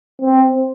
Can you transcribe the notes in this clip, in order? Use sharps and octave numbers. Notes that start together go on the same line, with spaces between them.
C4